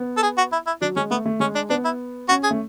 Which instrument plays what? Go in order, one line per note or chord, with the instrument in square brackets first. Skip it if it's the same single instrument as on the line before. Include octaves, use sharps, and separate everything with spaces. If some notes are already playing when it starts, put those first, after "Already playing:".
Already playing: [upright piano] B3
[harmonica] A4
G#4
F#4
E4
E4
[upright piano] F#3 [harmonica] D4
[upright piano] G#3 [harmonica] C#4
[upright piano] A3 [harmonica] B3
[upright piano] A3
[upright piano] G#3 [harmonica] C#4
[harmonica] D4
[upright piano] B3 [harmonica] D4
[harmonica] E4
[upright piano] C#4 [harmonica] F#4
[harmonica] G#4
[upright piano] A3